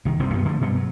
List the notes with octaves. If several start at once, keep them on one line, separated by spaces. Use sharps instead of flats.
C2 D#3
F1 C2 C3 C4
F#2 D#3 A#3 B3
D3 F3 A3
G2 B2 F#3 G3
F#3